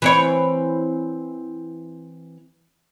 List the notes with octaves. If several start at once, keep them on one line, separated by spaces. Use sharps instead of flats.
E3 C4 C#5